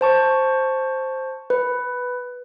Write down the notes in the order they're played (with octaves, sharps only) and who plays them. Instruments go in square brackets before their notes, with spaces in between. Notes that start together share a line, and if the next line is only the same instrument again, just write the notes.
[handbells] C5 A5 C#6
B4